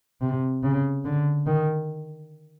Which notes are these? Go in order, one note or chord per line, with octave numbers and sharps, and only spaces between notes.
C3
C#3
D3
D#3